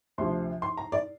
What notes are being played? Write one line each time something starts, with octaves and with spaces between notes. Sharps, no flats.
D2 C3 F3 C6
C6
A#5
D5